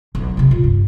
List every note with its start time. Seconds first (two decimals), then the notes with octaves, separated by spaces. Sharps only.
0.15 B1
0.37 C3 A#3
0.51 A#2
0.64 G2